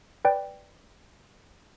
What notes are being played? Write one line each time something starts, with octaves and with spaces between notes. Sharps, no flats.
B4 D5 G5